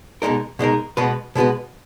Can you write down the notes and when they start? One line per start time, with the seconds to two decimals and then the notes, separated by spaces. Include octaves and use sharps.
0.22 B2 G#3 D#4 A#4
0.59 B2 G#3 D#4 A#4
0.97 B2 G#3 B3 F#4 B4
1.36 B2 G#3 B3 F#4 B4